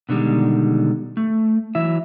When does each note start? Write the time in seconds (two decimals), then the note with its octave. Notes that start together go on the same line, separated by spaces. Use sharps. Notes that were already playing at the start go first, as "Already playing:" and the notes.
0.09 B2 D3 D#3 G3 G#3
1.17 A3
1.75 E3 F#3 E4 E5